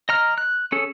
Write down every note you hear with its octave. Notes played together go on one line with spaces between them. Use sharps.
D#5 A#5 F6
F#6
C#4 G#4 A4